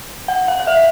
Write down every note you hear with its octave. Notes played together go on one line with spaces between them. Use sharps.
F#5
F5
F5
E5